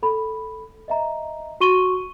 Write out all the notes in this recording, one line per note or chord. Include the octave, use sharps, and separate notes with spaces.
A4 B5
D#5 E5 A#5
F#4 C6 C#6 D#7 G7